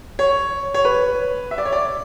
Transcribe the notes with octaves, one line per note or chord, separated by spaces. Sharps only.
C#5
C#5
B4
E5
D5
C#5
D5